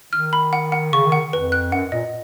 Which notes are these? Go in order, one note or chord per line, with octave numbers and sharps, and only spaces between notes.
D#3 F6
B5
F#5
F#5
C#3 C#6
D#3
F#5
F2 B4
F#6
F#2 F#5
A#2 D#5